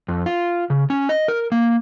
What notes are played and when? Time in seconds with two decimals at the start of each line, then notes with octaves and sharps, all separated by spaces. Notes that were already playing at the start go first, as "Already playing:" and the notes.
0.08 F2
0.26 F4
0.70 C#3
0.90 C#4
1.09 D#5
1.28 A#4
1.52 A#3